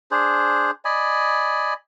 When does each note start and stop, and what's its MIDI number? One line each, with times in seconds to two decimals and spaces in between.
0.11 0.71 62
0.11 0.71 68
0.11 0.71 72
0.85 1.74 74
0.85 1.74 75
0.85 1.74 80
0.85 1.74 83